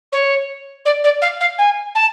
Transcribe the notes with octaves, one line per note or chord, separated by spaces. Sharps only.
C#5
D5
D5
F5
F5
G#5
A5